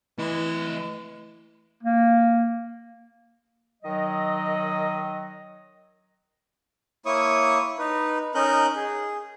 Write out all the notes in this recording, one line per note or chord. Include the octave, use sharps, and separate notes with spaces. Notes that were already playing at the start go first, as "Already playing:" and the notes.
E3 A3 D#5
A#3
D#3 F#3 D#5
A#3 E4 C#5 C#6 D#6
D#4 B4
C#4 D#4 A#4 D#5 F#6 G6
G#4